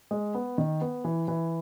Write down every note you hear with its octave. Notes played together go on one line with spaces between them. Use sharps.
G#3
B3
D#3
B3
E3
E3